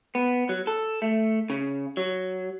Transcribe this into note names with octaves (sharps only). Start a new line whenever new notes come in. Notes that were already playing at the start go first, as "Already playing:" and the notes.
B3
F#3
A4
A3
C#3
F#3